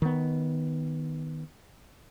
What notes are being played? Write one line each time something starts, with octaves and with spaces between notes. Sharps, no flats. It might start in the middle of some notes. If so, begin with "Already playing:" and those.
D#3 B3